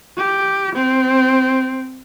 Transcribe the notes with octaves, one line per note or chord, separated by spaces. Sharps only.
G4
C4